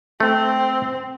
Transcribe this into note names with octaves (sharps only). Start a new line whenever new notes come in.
A3 C4